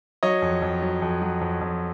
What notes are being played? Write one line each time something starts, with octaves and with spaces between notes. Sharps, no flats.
F#3 C#5 D#5
F2
F2
F#3
F2
F#3
F2
F2